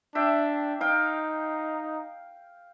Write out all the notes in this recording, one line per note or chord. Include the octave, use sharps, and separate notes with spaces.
D4 E5 G5
D#4 F5 G5